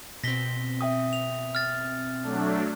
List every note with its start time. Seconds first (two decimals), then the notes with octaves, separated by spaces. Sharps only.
0.24 B2 C4 A#6 B6 G7
0.81 E5 G5 D#6
1.13 F7
1.55 F6 A6
2.22 F#3 A3 D4